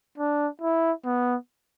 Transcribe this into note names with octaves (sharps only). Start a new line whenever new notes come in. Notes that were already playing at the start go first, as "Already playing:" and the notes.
D4
E4
B3